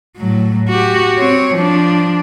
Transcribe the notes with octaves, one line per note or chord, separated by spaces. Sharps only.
A2 F#3
F#4 G4
C4 C#5
F3 D4